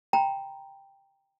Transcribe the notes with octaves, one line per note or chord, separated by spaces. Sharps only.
G5 A#5 B5